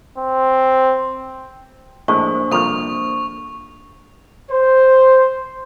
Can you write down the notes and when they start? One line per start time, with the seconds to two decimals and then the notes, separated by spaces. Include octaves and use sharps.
0.18 C4
2.08 A#1 A2 G#3 A#3 D4 C5 C#6
2.52 C2 A#2 F3 A4 C#6 F7
4.50 C5